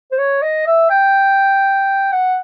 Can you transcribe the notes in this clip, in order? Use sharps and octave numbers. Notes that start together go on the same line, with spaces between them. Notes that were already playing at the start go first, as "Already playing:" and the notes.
C5
C#5
D#5
E5
G5
F#5